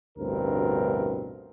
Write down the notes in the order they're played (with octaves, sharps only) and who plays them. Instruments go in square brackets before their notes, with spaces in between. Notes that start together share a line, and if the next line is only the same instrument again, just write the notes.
[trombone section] A1 D2 G2 B2 C4 A#4